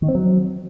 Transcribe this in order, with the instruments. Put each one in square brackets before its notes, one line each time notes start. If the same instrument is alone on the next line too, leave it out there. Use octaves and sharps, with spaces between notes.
[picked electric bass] D#3
C4
F#3